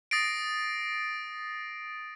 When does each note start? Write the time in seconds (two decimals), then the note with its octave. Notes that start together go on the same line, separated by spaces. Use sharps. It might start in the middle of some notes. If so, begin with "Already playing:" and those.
0.11 D#6 A6 A#6 C7 D7